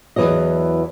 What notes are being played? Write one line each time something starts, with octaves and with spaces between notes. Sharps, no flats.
E2 C3 E3 F#3 D#5